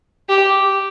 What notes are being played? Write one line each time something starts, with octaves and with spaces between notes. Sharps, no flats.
G4